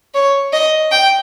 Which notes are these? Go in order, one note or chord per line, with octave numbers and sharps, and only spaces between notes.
C#5
D#5
G5